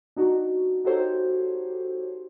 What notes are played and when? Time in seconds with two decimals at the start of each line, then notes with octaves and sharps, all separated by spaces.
0.16 D4 D#4 F#4
0.85 D#4 F#4 G4 A4 C5 C#5